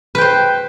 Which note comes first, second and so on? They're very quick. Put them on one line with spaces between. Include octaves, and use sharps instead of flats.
B4 G5 C5